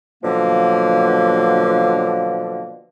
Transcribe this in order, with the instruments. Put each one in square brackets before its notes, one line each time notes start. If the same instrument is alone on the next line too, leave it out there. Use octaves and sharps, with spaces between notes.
[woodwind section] B2 D3 F3 F#3 A#3